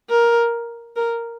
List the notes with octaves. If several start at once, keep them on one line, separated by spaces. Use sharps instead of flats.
A#4
A#4